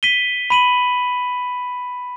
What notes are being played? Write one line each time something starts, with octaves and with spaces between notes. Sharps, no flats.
B6 D#7 G7
B5 D#7 F#7